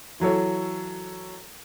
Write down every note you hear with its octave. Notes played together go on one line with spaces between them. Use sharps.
E3 F#3 A4 C#5